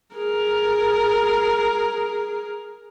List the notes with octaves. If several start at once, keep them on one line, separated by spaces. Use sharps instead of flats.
G#4 A#4